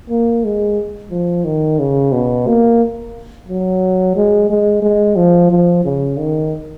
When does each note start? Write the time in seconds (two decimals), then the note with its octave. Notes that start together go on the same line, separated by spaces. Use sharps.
0.10 A#3
0.45 G#3
1.11 F3
1.45 D#3
1.80 C#3
2.12 B2
2.47 A#3
3.48 F#3
4.16 G#3
4.50 G#3
4.82 G#3
5.16 F3
5.51 F3
5.85 C#3
6.18 D#3